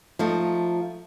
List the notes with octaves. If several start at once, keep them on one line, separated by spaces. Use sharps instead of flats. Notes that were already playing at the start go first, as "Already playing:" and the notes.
F3 A3 D#4